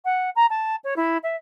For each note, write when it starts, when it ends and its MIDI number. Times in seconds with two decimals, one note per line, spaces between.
0.05 0.30 78
0.35 0.46 82
0.50 0.76 81
0.84 0.94 73
0.96 1.17 64
1.23 1.36 76